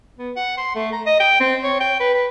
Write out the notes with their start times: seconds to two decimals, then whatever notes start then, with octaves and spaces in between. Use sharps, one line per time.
0.19 B3
0.36 F#5
0.58 C6
0.75 A3
0.92 A#5
1.06 D#5
1.20 G5
1.40 C4
1.63 C#5
1.81 G5
2.00 B4
2.14 B4